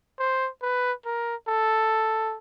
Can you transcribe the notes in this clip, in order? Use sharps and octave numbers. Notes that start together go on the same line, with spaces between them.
C5
B4
A#4
A4